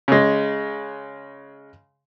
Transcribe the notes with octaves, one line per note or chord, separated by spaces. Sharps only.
C#3 G#3